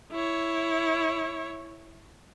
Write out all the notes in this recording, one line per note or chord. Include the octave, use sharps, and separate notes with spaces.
E4 C#5